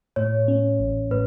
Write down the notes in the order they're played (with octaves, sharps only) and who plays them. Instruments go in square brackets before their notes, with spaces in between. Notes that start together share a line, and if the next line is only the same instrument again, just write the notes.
[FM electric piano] A2 [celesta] C#5
[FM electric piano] C#4
A1
[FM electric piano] A2 [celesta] B4